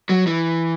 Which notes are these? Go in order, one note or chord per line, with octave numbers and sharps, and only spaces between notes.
F#3
E3